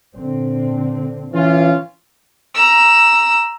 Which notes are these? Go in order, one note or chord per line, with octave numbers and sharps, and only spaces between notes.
A#2 D3 C4
E3 C#4 F4
A#5 E6